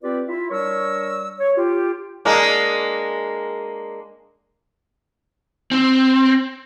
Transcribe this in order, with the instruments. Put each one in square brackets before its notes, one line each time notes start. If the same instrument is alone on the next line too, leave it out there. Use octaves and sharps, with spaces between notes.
[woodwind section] C4 F4 G4 B4 D5
E4 F4 E5
G3 D4 A#4 C#5 C#6 E6
C#5
F4 G4
[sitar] G#3 A#3 D4
[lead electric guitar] C4